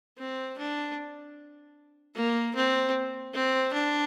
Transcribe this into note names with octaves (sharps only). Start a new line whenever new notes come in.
C4
D4
A#3
C4
C4
D4